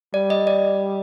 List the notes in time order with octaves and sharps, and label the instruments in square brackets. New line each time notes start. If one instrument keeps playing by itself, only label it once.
[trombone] G3 [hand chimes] D5
[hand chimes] D#5
D5